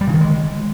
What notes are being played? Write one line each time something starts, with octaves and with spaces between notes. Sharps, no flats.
G3
C#3
D#3
G#3